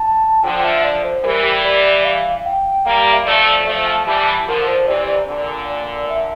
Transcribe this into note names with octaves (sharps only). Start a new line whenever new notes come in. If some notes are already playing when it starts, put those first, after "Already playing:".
Already playing: A5
D3 F3 G5
E5
D5
C5
E3 G3 A#4
D5
F5
G5
G3 A#3 F5
F5
E5
F3 A3 D5
F3 A3 E5
A5
E3 G3 A5
D3 F3 A#4
C5
C3 E3 D5
D5
A#2 D3 D5
D5
E5